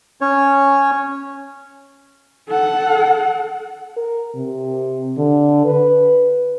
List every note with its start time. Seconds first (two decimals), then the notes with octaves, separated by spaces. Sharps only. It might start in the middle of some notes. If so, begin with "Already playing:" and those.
0.21 C#4 C#5
2.49 A4 F#5
3.97 A#4
4.35 C3
5.18 D3
5.65 B4